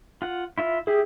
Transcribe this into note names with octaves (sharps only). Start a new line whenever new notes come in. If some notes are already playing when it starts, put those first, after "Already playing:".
F4 F#5
E4 F4 E5
E4 G4 G#4